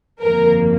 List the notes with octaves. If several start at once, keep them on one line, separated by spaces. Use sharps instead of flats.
G1 F2 D#3 A#3 A#4